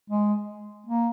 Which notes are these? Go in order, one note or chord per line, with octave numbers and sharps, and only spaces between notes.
G#3
A#3